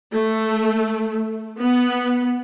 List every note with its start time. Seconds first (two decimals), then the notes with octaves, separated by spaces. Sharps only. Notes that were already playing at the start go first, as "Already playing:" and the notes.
0.12 A3
1.59 B3